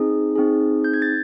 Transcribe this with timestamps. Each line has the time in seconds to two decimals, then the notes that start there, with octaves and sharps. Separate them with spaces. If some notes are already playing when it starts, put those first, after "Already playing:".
Already playing: C4 D#4 G#4
0.36 C4 D#4 G#4
0.84 G6
0.94 G#6
1.02 A6